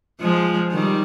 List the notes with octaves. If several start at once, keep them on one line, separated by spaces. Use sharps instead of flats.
F3 G#3
D#3 G3